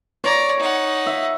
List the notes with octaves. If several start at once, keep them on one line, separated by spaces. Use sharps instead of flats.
C#5 D5 A#5
D#4 F#5
E5